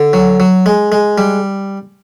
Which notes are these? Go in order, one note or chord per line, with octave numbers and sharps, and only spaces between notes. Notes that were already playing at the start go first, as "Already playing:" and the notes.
Already playing: D3
F#3
F#3
G#3
G#3
G3